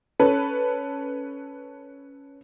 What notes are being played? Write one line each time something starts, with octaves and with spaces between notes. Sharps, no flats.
C#4 A4 B4